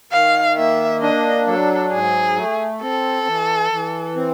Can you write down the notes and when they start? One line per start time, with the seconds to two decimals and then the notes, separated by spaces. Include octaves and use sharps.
0.12 D#3 F5
0.57 A#3 E5
1.02 D4 D#5
1.46 F#3 A4
1.92 G#2 G#4
2.36 A3
2.81 C4 A4
3.27 E3
3.72 E3
4.16 C4